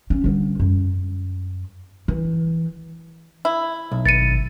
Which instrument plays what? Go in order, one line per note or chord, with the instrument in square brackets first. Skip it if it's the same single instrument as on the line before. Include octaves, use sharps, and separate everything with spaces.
[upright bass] C#4
D3 G3
F#2
E3
[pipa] E4
[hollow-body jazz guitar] B1
[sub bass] G#1 [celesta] A6 C#7 D#7